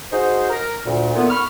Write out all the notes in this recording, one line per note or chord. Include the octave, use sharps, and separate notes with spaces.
D#4 F#4 G#4 C5
A#4
D2 A#2
A#2 D#3 A3 B3
B5 C#6 F6